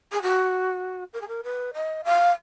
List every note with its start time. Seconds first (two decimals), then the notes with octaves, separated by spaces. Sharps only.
0.12 G#4
0.22 F#4
1.13 A#4
1.21 G#4
1.28 A#4
1.43 B4
1.74 D#5
2.04 F5